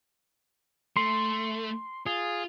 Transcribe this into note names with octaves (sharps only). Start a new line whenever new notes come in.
A3 C6
F4 G#4